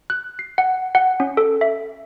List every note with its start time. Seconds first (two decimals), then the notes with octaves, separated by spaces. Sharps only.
0.10 F#6
0.39 C7
0.58 F#5
0.95 F#5
1.20 C#4
1.37 A4
1.61 E5